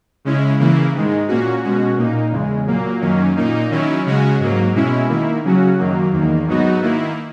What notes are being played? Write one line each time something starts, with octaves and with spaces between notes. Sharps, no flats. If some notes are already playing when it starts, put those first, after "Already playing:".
C#3 G#3 C#4 E4
C#3 E3 A#3 E4
G#2 D#3 G#3
A#2 A#3 C#4 F#4
B2 G#3 C#4 F#4
A#2 A#3 D#4
E2 C#3 G#3
A#2 F#3 A#3
F#2 D#3 F#3 A#3 C#4
A#2 A#3 D#4
D#3 F#3 C#4 E4
C#3 G#3 C#4 F#4
G#2 F#3 A#3
B2 G#3 C#4 E4
D#3 A#3 E4
C#3 F#3 C#4 F#4
F#2 D#3 F#3 A#3
E2 D#3 A#3
G#2 F#3 B3 D#4 F#4
D#3 A#3 E4